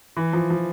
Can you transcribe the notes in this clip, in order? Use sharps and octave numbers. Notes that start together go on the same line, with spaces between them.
E3
F3
F3